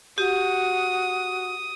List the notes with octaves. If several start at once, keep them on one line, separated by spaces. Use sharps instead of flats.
F#4 G4 D#6